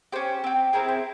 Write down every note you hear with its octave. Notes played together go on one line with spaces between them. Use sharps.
C#4 G4 C5
C4 G4
C4 E4 G#4 A#4
C5